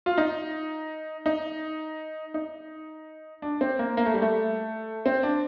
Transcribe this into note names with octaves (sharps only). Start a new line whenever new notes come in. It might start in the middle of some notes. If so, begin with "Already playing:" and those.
F4
D#4
D#4
D#4
D4
C4
A#3
A#3
A3
G3
A3
C4
D4